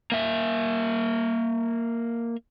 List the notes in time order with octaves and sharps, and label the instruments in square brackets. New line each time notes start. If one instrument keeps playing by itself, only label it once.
[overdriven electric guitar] A#3 E5